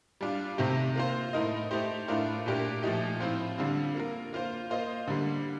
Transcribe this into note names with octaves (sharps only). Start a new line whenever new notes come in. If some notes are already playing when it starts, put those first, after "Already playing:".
G3 D4 F4
C3 D#3 A3 C4 G4
A#3 F4 C5
A2 A3 D#4 A#4 D#5
A3 D#4 G4 C5
A2 A3 D4 F4 A#4
A#2 A3 D4 G4 A#4
A#2 F3 A3 D#4 G4
A2 F3 C4 F4 C5
D3 G3 C4 F4
A#3 F4 A#4
A#3 F4 C5
A#3 F4 C5 D#5
D3 G3 A#3